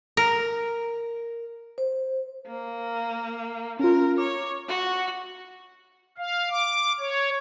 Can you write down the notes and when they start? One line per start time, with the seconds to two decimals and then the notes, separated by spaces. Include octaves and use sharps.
0.17 A#4
1.78 C5
2.46 A#3
3.79 C#4 F4 A#4
4.18 C#5 D6
4.68 F#4
6.18 F5
6.50 D6
7.00 C#5